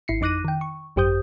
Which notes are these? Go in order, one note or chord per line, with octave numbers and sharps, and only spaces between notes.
G#1 E4 C7 C#7
F2 D#4 D6 F#6 A#6 D#7
D#3 G5
C#6
G#1 F#2 G4 C5 D#6 G6